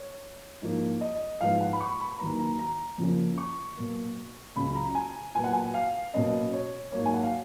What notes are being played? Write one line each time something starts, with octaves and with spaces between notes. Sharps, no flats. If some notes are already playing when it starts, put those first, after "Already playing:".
Already playing: C#5
G#2 F3 A#3
D#5
G#2 F3 G#3 B3 F5
F#5
B5
C#6
B5
D#2 D#3 F#3 B3 A#5
A#5
A#5
F2 C#3 F3 A#3 C#4
C#6
B2 F#3 A#3
C#2 C#3 F#3 B5
A#5
G#5
A#2 F#3 B3 G#5
F#5
G#5
F5
B2 F#3 A#3 C#4 D#5
C#5
G#2 F#3 A#3 C#5
G#5
F#5
F5